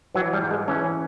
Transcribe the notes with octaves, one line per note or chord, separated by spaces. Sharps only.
E3 F#3
G3
G#2
G#3
E3 C#4